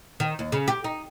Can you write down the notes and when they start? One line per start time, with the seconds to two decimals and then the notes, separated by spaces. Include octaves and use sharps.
0.20 D#3
0.39 D#2
0.52 C#3
0.68 G4
0.84 D#4